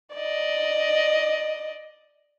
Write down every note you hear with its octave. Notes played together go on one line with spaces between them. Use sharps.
D5 D#5